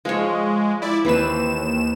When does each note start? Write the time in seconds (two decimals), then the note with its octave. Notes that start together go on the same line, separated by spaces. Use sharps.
0.05 F3 G#3 G#4 C#5
0.82 E4 D5
1.05 D#2 E3 C4 B4 E7